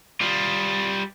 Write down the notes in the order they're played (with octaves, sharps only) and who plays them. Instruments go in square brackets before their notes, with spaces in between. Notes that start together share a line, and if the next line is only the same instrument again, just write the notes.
[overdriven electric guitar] G3 F4